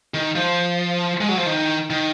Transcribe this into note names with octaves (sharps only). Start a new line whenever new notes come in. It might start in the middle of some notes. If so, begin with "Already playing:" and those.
D#3
F3
G#3
F#3
F3
D#3
D#3